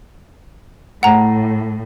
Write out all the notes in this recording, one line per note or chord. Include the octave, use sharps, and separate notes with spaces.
A2 F#5 A#5